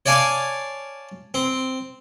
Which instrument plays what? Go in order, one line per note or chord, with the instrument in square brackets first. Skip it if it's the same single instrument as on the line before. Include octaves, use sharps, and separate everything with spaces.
[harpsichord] C#5 D5 F5 G#5 A5 D6
C4